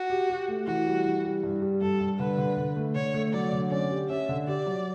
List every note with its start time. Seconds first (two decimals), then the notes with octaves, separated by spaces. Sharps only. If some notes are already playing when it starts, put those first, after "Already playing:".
Already playing: F#4
0.10 G4
0.30 G4
0.48 A3
0.67 E3 F#4
0.86 G3
1.06 E3
1.25 G3
1.43 G2
1.62 G3
1.82 G2 A4
2.01 G2
2.19 D3 B4
2.38 D3
2.57 D3
2.76 A3
2.95 D3 C#5
3.14 A3
3.33 F#3 D5
3.52 D3
3.71 C#4 D5
3.91 G4
4.09 C#4 E5
4.29 D3
4.48 G4 D5
4.66 F#3